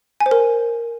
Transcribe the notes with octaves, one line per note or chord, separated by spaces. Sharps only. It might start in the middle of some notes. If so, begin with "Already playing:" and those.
G#5
C5
A#4